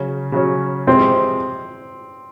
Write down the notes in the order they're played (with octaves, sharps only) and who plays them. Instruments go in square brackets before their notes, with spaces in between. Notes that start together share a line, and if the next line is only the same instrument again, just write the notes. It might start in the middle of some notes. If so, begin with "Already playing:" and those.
Already playing: [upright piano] C#3 F#3 C#4
C#3 F#3 C#4
[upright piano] C3 F3 G#3 [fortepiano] C4